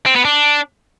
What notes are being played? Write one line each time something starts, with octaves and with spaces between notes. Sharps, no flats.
C4
B3
D4